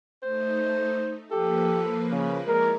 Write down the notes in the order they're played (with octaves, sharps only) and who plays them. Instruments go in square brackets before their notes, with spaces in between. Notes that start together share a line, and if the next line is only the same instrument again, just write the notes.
[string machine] A3 D#4 [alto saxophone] C5
[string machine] F3 A#3 B4 [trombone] G4 [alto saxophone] A4
[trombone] C#3
[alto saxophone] G#3 [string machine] E4 C#5 D5 [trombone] A#4